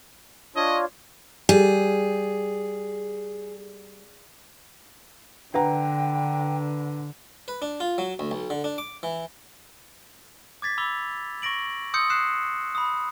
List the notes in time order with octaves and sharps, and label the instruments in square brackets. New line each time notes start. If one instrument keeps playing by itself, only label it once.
[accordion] D4 F4 C#5 [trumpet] D#5
[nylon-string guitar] G3 [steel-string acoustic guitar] G#4
[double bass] D3 [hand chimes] D4 [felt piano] B4 F#5 A#5 [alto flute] G5
[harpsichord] B4
D4
F4
F#3
D2
B1
D3
D4
D6
E3
[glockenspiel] D6 G#6 A6 B6
B5 D6 E6 F7 G7
C#6 A6 A#6 D7 F#7
C6 D#6 E6 G6 C#7
D#6 F#6 C7 E7
B5 D#6